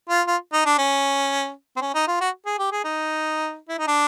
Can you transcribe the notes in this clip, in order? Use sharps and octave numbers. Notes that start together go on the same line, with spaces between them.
F4
F4
D#4
D4
C#4
C4
C#4
D#4
F4
F#4
G#4
G4
G#4
D#4
E4
D#4
D4